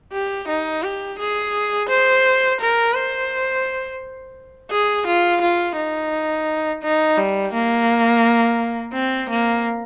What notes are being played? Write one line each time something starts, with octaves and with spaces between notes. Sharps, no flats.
G4
D#4
G4
G#4
C5
A#4
C5
G#4
F4
F4
D#4
D#4
G3
A#3
C4
A#3